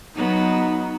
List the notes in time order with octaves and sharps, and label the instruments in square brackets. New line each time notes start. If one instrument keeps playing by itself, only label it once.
[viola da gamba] F#3 B3 [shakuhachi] D#4